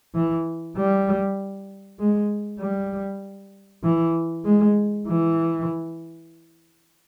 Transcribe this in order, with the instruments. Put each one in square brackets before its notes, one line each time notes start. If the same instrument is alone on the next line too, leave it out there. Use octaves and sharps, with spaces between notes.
[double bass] E3
G3
G#3
G3
E3
G#3
E3